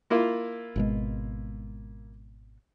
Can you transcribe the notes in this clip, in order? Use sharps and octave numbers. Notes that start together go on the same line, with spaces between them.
A#3 E4 F4
G#1 B2 G#3